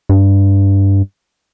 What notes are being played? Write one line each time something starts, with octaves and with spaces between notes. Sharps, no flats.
G2